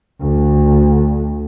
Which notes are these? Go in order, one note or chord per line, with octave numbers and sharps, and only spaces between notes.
D2 D3